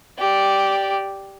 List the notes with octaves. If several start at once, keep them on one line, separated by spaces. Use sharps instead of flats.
G4 D5